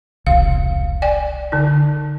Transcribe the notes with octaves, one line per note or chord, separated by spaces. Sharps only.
E1 C2 F5
D5 G5 G#5
D3 D#4